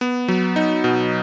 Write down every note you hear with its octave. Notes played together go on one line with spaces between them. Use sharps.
B3
F#3
D#4
B2